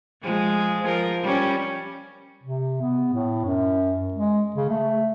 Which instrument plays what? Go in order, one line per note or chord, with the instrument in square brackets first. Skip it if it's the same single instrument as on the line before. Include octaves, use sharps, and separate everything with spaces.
[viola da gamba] F3 G#3
F3 A#4
G3 C#4
[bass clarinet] C3
B3
A2
F#2
G#3
C#3
A3